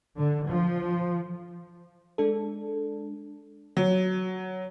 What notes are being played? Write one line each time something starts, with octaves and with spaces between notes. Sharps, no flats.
D3
F3
G#3 D4 A4
F#3